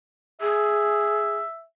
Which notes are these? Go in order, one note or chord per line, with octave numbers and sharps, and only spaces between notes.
G#4 E5